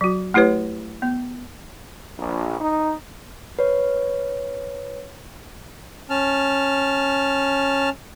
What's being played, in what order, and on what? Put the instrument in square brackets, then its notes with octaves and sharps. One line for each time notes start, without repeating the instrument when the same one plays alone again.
[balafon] F#3 F#4
A3 E4 G4 B4 C#5
B3
[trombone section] A#1
D#4
[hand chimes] B4 C#5
[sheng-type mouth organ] C#4 A5 F6